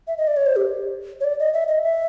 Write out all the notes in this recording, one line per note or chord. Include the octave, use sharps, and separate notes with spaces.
E5
D#5
D5
C#5
C5
G4
C#5
D5
D#5
E5
D#5
E5